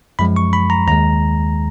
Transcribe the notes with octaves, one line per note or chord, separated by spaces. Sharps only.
F#2 F3 G#3 B5
C#6
B5
A#5
D#2 D#3 G#3 A#5